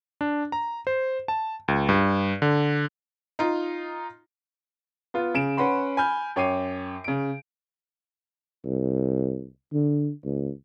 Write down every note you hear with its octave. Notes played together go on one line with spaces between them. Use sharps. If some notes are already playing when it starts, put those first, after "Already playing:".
D4
A#5
C5
A5
C#2
G2
D3
D#4 F4
B3 F4
C#3 D7 E7
C#4 B4 F#5 B5 C6
G#5 B5 F6 G6
F#2 C#5 G5 D6 C7 D#7
C#3 D7
C2
D3
C#2